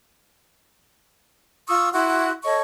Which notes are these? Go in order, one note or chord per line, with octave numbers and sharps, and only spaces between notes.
F4 C#6 D#6 E6
E4 F#4 F#5 C6
A4 C#5 D#5 C#6